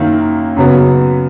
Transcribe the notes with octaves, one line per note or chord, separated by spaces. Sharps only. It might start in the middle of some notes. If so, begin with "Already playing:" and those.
Already playing: F#2 D#3 A#3 E4
F#2 C#3 F#3 B3